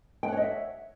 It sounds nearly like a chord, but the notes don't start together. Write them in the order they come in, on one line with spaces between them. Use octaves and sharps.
G5 F#5 C#5 D#5 E5